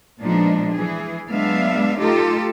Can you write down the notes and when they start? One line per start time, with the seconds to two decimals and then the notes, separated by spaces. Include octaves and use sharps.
0.22 A#2 F3 G#3 B3 D4 D#4
0.74 E3 G#4
1.28 F#3 G#3 B3 D4 E5 F5
1.99 A3 D#4 F4 G4 A4